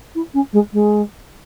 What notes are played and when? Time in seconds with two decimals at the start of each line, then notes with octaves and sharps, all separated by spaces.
0.15 E4
0.34 C#4
0.53 G#3
0.73 G#3